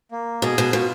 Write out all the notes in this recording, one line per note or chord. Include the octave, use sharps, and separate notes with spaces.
A#3
B2 G#4
B2
B2 F4